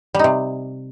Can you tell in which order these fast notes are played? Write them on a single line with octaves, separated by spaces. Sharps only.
G3 D#4 C3